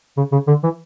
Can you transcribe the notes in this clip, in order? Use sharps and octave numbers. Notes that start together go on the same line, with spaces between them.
C#3
C#3
D3
E3